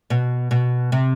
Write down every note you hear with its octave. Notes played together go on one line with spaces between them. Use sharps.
B2
B2
C3